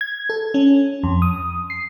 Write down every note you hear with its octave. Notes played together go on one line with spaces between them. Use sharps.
G#6
A4
C#4
F2
D#6
C7